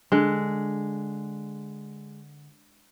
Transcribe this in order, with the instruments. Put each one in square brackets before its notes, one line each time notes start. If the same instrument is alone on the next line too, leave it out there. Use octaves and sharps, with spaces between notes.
[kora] D3 G#3